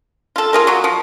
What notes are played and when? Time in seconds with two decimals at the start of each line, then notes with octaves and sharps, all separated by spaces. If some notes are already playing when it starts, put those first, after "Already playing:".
0.36 F4 A4
0.53 F4 G#4 A#4
0.67 F#3 F#4
0.84 F3